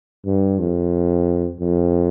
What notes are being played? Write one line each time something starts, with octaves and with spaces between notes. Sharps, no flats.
G2
F2
F2